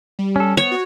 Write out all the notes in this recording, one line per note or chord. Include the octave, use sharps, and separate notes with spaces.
G3
C#4 A4
B3 C#5
F#4